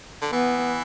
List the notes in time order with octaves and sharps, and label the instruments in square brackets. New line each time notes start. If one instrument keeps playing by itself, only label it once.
[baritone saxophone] D3
[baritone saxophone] E3 [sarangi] B3